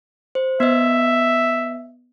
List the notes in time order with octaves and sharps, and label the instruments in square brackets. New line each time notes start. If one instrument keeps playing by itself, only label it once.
[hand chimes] C5
[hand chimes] B3 D#5 [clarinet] E5